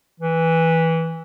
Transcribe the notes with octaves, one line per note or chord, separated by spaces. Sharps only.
E3